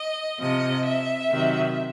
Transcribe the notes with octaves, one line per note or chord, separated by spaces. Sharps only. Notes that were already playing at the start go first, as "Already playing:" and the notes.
Already playing: D#5
C3 F3 D#5
E5
C3 D#3 F#3